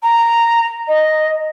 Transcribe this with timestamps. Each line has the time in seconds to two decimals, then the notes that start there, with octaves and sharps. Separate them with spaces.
0.03 A#5
0.88 D#5